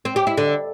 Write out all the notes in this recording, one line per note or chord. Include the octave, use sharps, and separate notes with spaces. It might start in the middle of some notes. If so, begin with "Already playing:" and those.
C4
G4
E4
D3